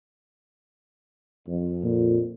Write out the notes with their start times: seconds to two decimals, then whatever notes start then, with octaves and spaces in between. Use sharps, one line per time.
1.47 F2
1.84 A#2